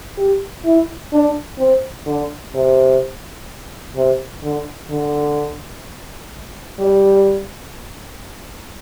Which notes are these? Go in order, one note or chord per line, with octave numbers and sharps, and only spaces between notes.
G4
E4
D4
C4
D3
C3
C3
D3
D3
G3